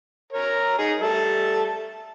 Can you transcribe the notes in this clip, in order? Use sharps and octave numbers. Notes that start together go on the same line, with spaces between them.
A#4 C#5 A#5
D#4 G#4
G3 A4 E5